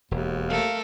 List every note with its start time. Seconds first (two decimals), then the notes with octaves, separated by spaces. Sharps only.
0.11 E1 D#2
0.49 A3 A4 A#4 F5